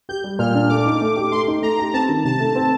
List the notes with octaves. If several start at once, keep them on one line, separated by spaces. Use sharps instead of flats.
G4 G6
G3
A#2 F6
D4
A3 D6
D#4
A3
G4
A3 C6
D#4
A3 A#5
G4
C4 A5
D#3
C3 A5
A3
C4